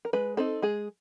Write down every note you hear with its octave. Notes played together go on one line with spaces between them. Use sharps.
A#4
G#3 B4
C4 D#4 A4
G#3 G#4